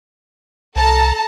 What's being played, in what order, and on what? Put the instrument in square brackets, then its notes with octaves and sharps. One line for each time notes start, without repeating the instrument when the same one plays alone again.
[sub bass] C2 [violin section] A4 A5 A#5